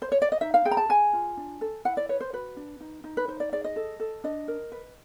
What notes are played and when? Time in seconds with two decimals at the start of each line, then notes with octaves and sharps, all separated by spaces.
0.02 C5
0.12 C#5
0.22 D5
0.32 D#5
0.41 D#4 E5
0.54 F5
0.65 G#4 G5
0.71 A#5
0.77 A5
0.89 G#4 G#5
1.13 F4
1.37 D4
1.61 A4
1.85 E4 F#5
1.97 D5
2.09 B4 C#5
2.21 C5
2.33 F#4 B4
2.57 D4
2.80 D#4
3.04 D#4
3.17 B4
3.28 D#4 C5
3.40 D5
3.52 G#4 D5
3.64 D#5
3.76 A4
4.00 A4
4.24 D4 D#5
4.48 A#4
4.72 B4